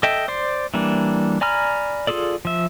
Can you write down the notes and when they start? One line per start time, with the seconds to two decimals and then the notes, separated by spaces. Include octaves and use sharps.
0.03 A4 D#5 E5 G5
0.28 C5 D5 C6
0.74 E3 G3 A#3 D4
1.41 D5 G#5 A#5 B5 F6
2.07 F4 F#4 G#4 A4 D5
2.45 F3 E5